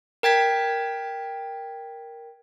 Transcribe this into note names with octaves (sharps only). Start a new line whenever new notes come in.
A#4 G5 G#6 B6